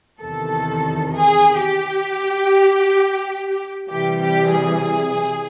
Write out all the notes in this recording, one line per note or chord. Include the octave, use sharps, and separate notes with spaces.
E2 C3 D#3 A4
G#4
G4
C3 E3 G3 G4
G4
G#4